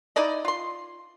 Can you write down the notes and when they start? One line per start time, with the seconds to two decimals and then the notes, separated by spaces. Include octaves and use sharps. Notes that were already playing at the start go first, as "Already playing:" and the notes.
0.16 D#4 E4 D5 D#5
0.45 F4 C6